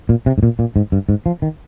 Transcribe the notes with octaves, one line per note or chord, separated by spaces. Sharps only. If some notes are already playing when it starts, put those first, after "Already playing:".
A#2
C3
G#2
A#2
A#2
G#2
G2
G#2
F3
D#3